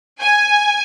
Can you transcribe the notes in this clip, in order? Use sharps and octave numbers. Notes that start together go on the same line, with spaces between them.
G#5